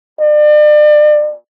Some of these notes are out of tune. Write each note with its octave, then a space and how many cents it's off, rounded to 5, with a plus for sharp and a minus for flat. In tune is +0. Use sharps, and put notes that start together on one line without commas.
D5 +35